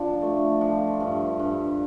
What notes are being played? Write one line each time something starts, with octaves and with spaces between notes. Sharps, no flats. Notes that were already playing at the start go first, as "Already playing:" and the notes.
Already playing: F3 D4
A3
F3
G2
G2